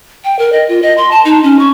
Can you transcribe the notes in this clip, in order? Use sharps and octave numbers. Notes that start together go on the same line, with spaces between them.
G5
A#4
D#5
F4
D#5
C6
A5
D#4
C#4
C#6